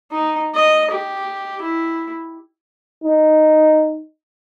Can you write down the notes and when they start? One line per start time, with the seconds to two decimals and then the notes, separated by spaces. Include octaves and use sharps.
0.12 D#4
0.55 D#5
0.91 G4
1.62 E4
3.04 D#4